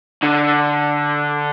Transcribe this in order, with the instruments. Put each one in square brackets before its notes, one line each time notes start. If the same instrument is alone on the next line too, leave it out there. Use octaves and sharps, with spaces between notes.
[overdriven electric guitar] D3